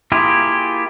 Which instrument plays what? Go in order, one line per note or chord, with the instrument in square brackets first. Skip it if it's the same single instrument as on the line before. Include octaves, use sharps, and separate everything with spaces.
[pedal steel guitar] A#3 E4 F4 G4 G#4